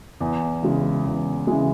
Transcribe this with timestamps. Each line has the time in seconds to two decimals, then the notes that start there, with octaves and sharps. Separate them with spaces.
0.20 E2
0.63 C#3 E3 G#3
1.05 E2
1.47 C#3 E3 G#3